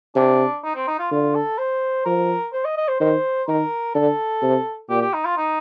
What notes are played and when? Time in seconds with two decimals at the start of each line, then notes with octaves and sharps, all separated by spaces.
0.16 C3 D4
0.64 D#4
0.75 C4
0.87 D#4
0.99 F4
1.11 D3 F4
1.35 A4
1.58 C5
2.05 F3 A#4
2.53 C5
2.65 D#5
2.77 D#5
2.88 C5
3.00 D#3 C5
3.48 D#3 A#4
3.94 D3 A4
4.42 C3
4.90 A#2 G4
5.01 G4
5.13 D#4
5.25 F4
5.37 D#4